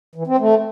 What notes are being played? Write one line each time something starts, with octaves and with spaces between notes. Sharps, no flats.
E3
C4
A3